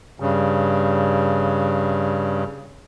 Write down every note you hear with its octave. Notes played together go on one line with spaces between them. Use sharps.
G2 C#3